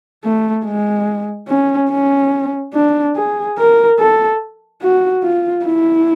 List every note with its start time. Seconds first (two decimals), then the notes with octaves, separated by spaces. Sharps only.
0.24 A3
0.65 G#3
1.48 C#4
1.90 C#4
2.74 D4
3.16 G#4
3.58 A#4
3.99 A4
4.82 F#4
5.23 F4
5.65 E4